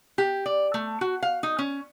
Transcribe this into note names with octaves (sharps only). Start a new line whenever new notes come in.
G4
D5
A3
F#4
F5
D#4
C#4